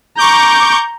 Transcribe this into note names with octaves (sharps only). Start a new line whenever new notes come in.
A#5 C#6 D6 G6